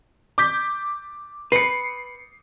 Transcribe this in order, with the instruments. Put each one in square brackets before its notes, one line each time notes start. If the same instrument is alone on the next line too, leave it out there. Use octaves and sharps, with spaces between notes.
[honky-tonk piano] D6 G6 B6
[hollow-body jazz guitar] B4 [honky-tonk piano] C7 C#7